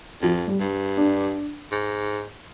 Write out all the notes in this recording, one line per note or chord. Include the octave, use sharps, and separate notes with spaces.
F2 F3
G3
G2
D4
G#2